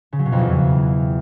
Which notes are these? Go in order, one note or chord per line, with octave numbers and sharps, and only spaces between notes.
C#3
F#3
B2
F2
E2